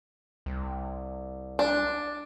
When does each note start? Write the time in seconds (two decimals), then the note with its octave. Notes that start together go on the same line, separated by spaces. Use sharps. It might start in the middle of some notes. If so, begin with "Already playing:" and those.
0.46 C2
1.59 D4